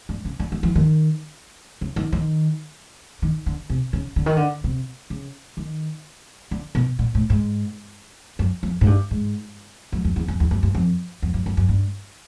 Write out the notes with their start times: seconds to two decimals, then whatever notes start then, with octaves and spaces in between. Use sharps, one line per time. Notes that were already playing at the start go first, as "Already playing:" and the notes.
0.09 G2
0.25 C#3
0.40 D3
0.52 D#3
0.63 E3
0.75 D#3
1.81 C#3
1.96 D#3
2.12 D#3
3.22 D#3
3.46 D3
3.70 C3
3.93 C#3
4.16 D3
4.26 D#3
4.37 D3
4.64 C3
5.10 C#3
5.57 D#3
6.51 D3
6.75 B2
6.99 A#2
7.15 A2
7.30 G#2
8.39 F#2
8.63 F2
8.81 G#2
8.87 G2
9.11 G#2
9.92 F#2
10.05 F2
10.16 E2
10.28 F2
10.40 E2
10.51 F#2
10.63 G2
10.75 F2
11.22 F2
11.34 F#2
11.46 F#2
11.57 F#2
11.69 G2